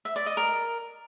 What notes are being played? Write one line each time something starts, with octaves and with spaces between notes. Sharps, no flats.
E5
D5
D#5
A#4